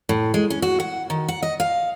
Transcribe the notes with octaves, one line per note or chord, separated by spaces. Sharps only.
A2
G#3
C#4
F#4
F#5
D#3
F#5
D#5
F5